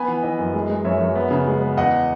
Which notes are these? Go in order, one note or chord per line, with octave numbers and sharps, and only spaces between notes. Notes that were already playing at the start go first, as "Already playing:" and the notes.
Already playing: B3 G#5 B5
E3
E3 B4 D#5
F#2
G#3
G#3
F#2 C#5 E5
F#2
B3
C#3
G#3
B3
E2 D#5 F#5